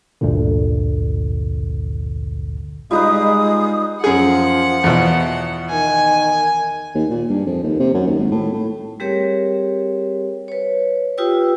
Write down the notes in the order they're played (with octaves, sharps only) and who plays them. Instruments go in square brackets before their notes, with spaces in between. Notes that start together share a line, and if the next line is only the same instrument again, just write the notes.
[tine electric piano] A1 D2 G2 A#2 D3
[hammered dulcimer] G3 D#4 B4 [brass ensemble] G#3 [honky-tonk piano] F4 [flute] D#6
[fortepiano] F#2 G#4 [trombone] F3 [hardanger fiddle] F#5
[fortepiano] E2 B2
[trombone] D#3 [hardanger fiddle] G#5
[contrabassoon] D#2
A#2
G2
F2
D#2
C3
F#2
D#2
G#1
A2
A2
[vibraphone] G3 C4 G4 G#4 A#4 C#5
B4 C#5
F4 G4 B4 G5 D#6 E6